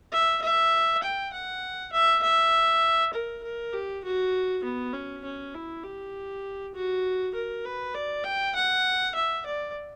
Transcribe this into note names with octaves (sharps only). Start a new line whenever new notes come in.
E5
E5
G5
F#5
E5
E5
A#4
A#4
G4
F#4
B3
C#4
C#4
E4
G4
F#4
A#4
B4
D5
G5
F#5
E5
D5